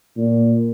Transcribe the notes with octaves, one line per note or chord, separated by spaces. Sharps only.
A#2